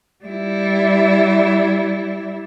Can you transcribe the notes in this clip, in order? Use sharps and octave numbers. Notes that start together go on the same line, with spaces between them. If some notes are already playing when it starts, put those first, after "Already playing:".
G3 E4